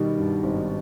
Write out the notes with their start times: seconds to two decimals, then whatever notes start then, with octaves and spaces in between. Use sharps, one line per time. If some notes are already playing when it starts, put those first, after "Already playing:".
Already playing: B2 D#3 G3
0.18 G2
0.43 G#1